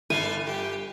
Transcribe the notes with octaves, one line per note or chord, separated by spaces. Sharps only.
G1 A4 F5 G#5
G4